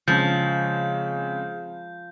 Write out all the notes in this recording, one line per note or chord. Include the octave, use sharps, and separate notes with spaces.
C#3 F3 G#3 C4 G6